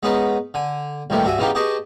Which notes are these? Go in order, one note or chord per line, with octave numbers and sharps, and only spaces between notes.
G#3 B3 C#4 D#4 B4
D3 G#5
C2 A#2 D#3 E3 G3 A3
G2 F#4 E5 G#5
C#3 E3 B3 D#4 F4 G4
G4 G#4 B4 D#5 A5 C#6